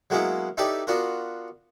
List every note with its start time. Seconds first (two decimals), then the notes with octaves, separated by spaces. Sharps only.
0.10 F#3 G#3 A#3 B3 C#4 E4
0.57 D#4 E4 G4 A4 B4 D5
0.87 B3 D4 F4 F#4 A#4